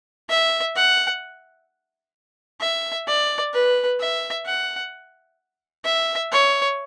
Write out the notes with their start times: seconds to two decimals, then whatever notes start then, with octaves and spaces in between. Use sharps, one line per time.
0.30 E5
0.76 F#5
2.61 E5
3.07 D5
3.54 B4
4.00 E5
4.46 F#5
5.85 E5
6.32 C#5